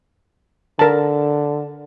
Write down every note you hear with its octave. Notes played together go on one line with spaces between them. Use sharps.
D3 A#4 A5